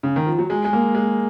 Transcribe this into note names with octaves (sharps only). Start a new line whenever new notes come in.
C#3
D#3
F3
F#3
G#3
G#3
A#3
G#3